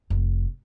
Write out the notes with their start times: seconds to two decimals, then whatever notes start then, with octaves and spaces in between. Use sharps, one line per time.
0.10 F1